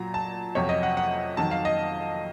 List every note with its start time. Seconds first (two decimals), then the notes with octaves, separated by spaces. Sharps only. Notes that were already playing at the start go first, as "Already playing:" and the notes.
Already playing: A#2 F#3 A#5
0.14 A5
0.55 F2 C3 F#3 C#5
0.69 D#5
0.83 F#5
0.97 F#5
1.37 F2 D#3 F#3 A5
1.51 F5
1.65 D#5